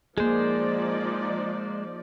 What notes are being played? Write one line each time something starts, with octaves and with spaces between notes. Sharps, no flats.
F3 G#3 A#3 D#4 G#4 C5 D5